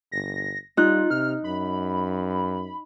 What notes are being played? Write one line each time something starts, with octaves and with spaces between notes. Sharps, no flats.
G1 A#6
G3 D#4 F4 F#6
C3 F6
F#2 B5